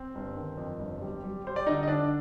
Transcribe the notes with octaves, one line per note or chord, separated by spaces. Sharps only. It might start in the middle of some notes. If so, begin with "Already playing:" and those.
Already playing: C4 C5
G1
D#3
F2
G1
G3
G3
G3 C5
D5
D3 D#4 D#5
D#5
D3 D4 D5